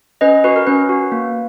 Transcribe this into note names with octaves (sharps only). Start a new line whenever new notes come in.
C#4 B4 D#5
F#4 B4
A#4
C#4 B4
F#4
A#3